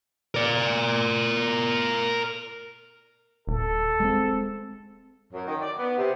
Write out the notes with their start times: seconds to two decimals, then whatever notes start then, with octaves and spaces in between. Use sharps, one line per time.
0.35 A#4 D5
3.47 D#1 A4
4.00 G#3 A3 C4
5.33 F#2
5.47 D#3
5.62 D5
5.78 B3
5.97 C3